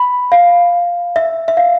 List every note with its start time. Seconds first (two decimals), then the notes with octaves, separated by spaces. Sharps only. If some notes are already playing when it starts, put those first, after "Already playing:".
Already playing: B5
0.32 F5
1.16 E5
1.48 E5
1.57 F5